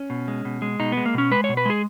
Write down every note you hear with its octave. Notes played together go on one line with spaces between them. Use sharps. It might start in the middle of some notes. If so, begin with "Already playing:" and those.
Already playing: C#4
B2
G#3
B2
G#3
B2 D#4
G#3 B3
A#3
B2 C#4
G#3 B4
C#5
B2
B4
G#3 G#4